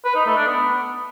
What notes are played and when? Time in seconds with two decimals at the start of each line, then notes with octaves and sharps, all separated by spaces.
0.05 B4
0.16 D#4
0.26 A3
0.37 D4
0.47 B3